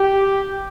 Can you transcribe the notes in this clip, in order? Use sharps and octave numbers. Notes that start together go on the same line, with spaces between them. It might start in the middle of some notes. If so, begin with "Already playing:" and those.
Already playing: G4